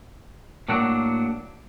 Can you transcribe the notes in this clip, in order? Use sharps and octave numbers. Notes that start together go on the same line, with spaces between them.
A2 F#3 A#3 D4 F#4